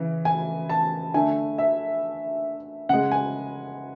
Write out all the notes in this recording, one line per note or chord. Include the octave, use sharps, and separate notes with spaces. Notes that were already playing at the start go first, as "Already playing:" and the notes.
Already playing: C#3 E3
G#5
A5
D3 A3 G#5
E5
C#3 G#3 F#5
G#5